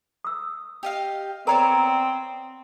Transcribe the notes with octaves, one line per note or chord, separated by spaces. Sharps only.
D#6 E6
G4 D#5 F5
B3 C4 A#4 C#5 D5 A#5